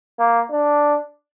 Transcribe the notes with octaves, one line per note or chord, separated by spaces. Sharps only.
A#3
D4